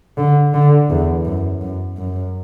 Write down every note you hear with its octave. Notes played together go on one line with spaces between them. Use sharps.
D3
D3
E2
F#2
F#2
F#2